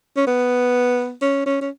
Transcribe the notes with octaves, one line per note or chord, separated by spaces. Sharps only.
C#4
B3
C#4
C#4
C#4